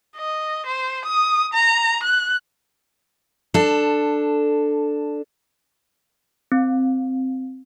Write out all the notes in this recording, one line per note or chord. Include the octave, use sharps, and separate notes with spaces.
D#5
C5
D#6
A#5
F#6
D4 A4
C4